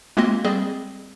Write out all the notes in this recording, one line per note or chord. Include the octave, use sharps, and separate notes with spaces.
G#3 A#3 C4 F4 F#4 D#5
G3 C4 G#4 D5 D#5